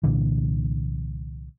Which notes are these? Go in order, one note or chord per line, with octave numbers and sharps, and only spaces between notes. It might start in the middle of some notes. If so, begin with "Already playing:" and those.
C2 A#2 D3 E3